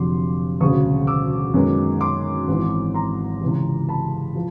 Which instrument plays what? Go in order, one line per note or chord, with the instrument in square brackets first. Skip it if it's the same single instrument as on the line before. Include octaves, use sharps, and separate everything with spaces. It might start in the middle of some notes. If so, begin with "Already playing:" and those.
Already playing: [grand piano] F1 F2 D3 F#3 C6 D6
E1 D2 C#3 F#3 C#6 D#6
D6 E6
F#2 D#3 G#3 B3
C6 D6
G#1 G#2 E3
A#5 C6
C#2 C3 E3
A5 B5
F3